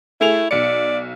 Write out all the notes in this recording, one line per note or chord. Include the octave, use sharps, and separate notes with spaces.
A3 E4 G#4 F7
B1 D5 C#7